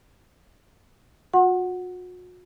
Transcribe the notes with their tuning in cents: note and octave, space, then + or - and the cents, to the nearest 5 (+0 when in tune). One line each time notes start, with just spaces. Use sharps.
F#4 -40 F#5 +0 C6 +45